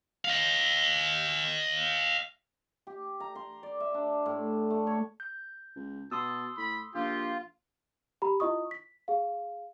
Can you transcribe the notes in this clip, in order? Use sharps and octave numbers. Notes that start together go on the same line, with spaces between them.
D#5 F5
G4
A#5
C6
D5
E5
D4
A2
A3
C#5
G6
C#2
B2 A5 C6 D#6 E6
A2 B5
A#1 F4 G4
G4 A#5 B5
E4 F4 D#5 C#6 D#6
B6
G#4 F5